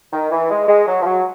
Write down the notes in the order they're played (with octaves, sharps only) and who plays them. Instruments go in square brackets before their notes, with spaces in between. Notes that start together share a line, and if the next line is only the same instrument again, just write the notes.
[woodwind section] D#3
E3
G#3
G#3
F#3
F3
F#3